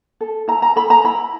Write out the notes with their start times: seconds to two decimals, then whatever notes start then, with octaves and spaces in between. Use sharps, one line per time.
0.21 A4
0.48 E4 A#5
0.62 A#5
0.76 A4 B5
0.90 A#5
1.04 E4 B5